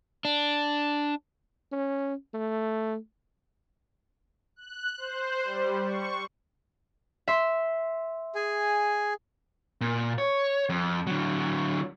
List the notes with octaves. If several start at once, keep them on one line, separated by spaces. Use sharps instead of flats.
D4
C#4
A3
F#6
C5
G3
C#6
E5 C6
G#4 G#5
A#2
C#5
F2
D3 F#3